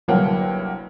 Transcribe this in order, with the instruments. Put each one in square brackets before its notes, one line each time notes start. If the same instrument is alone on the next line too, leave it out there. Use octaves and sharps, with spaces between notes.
[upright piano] G1 C2 F#3 A#3 F#5 G5